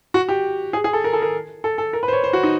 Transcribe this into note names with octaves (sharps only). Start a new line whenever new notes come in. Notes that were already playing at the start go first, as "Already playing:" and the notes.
F#4
G4
G#4
G#4
A4
A#4
A4
A#4
A4
A4
A#4
B4
C5
C#5
C5
F#4
D#4